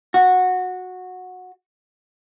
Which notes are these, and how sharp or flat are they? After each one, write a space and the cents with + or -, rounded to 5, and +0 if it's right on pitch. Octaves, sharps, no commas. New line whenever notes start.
F#4 -15